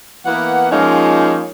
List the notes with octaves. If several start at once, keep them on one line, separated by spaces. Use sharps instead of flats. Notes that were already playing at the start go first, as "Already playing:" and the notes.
E3 A#3 B3 F#5
F3 G#3 A#3 C#4 D#4 F4